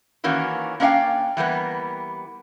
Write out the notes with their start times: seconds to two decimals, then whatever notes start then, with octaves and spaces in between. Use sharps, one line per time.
0.24 D#3 E3 A#3 C#4 F#4
0.80 A#3 C#4 D4 E5 F5 G5
1.37 E3 G3 A#3 B3